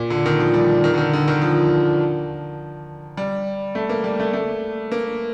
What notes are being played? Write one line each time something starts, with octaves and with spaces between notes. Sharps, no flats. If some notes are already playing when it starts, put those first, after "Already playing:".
Already playing: A#2
D3
D#3
F3
G3
D#3
D3
D#3
D3
D#3
F3
G3
A3
A#3
G3
A3
A3
A#3